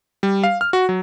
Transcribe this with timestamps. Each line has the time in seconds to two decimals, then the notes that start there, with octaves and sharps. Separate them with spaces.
0.23 G3
0.43 F5
0.61 F6
0.73 F#4
0.89 F#3